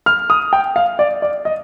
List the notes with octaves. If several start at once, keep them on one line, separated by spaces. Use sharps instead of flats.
F6
D#6
G5
F5
D5
D5
D#5